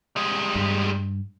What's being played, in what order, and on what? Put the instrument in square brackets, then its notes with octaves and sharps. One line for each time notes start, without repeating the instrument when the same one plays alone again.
[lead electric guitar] G3 G#3
[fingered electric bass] G2